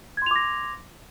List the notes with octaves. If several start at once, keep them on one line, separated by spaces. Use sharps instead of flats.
C6 D6 G#6 A#6 F7